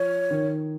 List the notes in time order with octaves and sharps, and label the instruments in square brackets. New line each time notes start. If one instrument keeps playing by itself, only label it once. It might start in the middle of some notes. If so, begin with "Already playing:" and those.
Already playing: [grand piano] F3 [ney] C#5
[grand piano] D#3